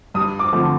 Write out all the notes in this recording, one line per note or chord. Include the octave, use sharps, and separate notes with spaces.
G2 D#6
D6
D3 F3 A3 C4